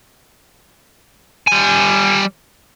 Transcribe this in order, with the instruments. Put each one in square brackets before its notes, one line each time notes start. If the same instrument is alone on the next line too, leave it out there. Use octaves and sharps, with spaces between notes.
[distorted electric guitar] G3 G#5